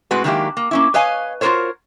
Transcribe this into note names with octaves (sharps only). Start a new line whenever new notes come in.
A2 G#3 C4 F#4 B4
D#3 F#3 G#3 A#3 E4 G4
A#3
A#3 C#4 E4
B4 C#5 D#5 F5 G#5
F4 F#4 G#4 A#4 C5 C#5